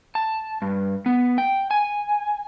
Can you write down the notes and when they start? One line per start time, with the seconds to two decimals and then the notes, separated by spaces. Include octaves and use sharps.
0.15 A5
0.62 G2
1.06 B3
1.38 G5
1.71 G#5